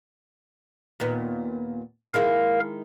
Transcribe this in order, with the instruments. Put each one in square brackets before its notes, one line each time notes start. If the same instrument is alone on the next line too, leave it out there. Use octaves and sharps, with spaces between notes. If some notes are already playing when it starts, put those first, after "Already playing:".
[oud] D#2 A#2 B3
[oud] D#3 G#3 E4 [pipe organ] A#4 F5